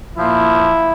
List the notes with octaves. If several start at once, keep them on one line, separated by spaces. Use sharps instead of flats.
A#2 F3 E4